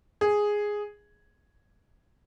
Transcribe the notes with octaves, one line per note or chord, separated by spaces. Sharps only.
G#4